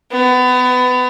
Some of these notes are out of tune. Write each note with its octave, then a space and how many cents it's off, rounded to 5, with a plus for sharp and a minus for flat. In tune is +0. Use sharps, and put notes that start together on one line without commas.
B3 +25